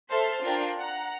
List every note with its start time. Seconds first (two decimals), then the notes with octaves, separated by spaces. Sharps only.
0.10 A4 C5 E5 A5 C6 F6
0.43 D4 F4 A#4 G5
0.77 F#5 A#5